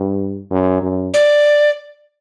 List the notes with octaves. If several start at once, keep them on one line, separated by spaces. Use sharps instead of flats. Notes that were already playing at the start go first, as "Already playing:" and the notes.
Already playing: G2
F#2
F#2
D5